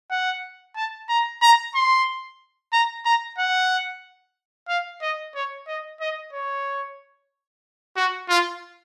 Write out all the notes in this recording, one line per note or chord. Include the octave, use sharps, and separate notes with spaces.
F#5
A5
A#5
A#5
C6
A#5
A#5
F#5
F5
D#5
C#5
D#5
D#5
C#5
F#4
F4